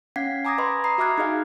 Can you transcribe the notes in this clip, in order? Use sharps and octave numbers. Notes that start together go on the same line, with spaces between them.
C#4 F5 F#5 G#6 B6 C7
G#5 A#5 D6 D#6 G#6 A#6
B4 D#5 B5 C6
A#5 B5 D#6 C7
F#4 E5 D6 F6 F#6 G#6
D#4 G#4 D#5 F5 G#5